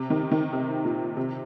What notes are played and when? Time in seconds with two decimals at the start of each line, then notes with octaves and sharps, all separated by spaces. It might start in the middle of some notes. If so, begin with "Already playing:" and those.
Already playing: C3
0.10 D#3
0.31 D#3
0.53 C3
0.85 A#2
1.17 C3